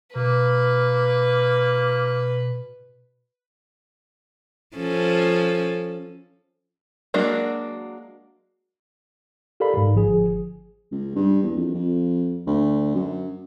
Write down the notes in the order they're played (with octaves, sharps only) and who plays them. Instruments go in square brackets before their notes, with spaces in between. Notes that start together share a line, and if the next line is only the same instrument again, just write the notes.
[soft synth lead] B2 [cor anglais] A#3 [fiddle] B4
[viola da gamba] F3 C#4 A4
[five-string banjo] F#3 G#3 A#3 D4 F#4
[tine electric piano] G4 A4 A#4 D5 F5 B5
G#2
G1 F3 G#4
[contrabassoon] C#2
G2
E2
F2
F2
D2
F#2